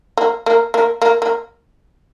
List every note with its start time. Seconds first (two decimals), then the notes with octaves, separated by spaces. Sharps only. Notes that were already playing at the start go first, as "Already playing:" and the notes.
0.17 A#3
0.46 A#3
0.74 A#3
1.02 A#3
1.22 A#3